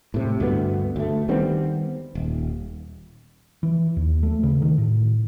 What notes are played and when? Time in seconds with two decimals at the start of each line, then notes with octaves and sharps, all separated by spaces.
0.14 A2 C3
0.40 D2 G2 B3
0.96 D2 A3
1.28 D#3 G3 B3 C4
2.15 D#1
3.63 E3
3.97 D#2
4.23 A3
4.43 C#3
4.62 D#3
4.78 A2